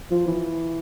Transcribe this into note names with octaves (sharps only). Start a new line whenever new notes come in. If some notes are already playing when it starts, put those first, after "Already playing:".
F3
E3